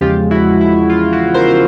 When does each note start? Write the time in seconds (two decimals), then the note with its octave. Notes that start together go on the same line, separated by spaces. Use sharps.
0.01 E2 C#3 F3 G#3 F4 G4
0.31 E4 F#4
0.61 E4
0.90 F4
1.13 E4 F#4
1.34 A#4 C5